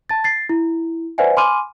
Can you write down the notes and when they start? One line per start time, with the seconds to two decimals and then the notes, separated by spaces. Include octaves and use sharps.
0.09 A5 A6
0.24 A6 C7
0.49 E4
1.18 B4 C5 D5 E5 F#5 G#5
1.37 G#5 B5 C6 D6 F6 D#7